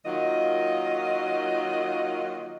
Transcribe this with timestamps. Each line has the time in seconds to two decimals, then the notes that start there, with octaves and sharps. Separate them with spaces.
0.05 D#3 F#3 A#3 F4 D#5